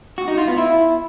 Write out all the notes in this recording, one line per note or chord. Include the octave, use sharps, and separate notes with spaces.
F#4
D#4
F4
B3
E4